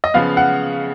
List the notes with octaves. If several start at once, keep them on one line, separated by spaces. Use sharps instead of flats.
D#5
C#3 F3 B3 F5
F#5